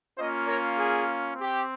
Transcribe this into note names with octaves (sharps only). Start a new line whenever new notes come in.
A#3 C#4 F4 C5 D#5
A#4 C#5
G#4
C4 G4